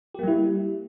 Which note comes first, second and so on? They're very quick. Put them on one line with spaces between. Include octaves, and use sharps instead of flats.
G4 A#3 G3 E4